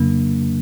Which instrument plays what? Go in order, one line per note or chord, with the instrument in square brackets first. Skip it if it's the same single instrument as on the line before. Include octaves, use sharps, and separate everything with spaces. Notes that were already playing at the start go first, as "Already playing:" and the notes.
Already playing: [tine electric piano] F2 C#3 F#3 A#3 D4